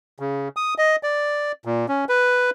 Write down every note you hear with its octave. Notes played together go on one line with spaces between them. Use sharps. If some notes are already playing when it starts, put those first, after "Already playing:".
C#3
D#6
D#5
D5
A#2
C#4
B4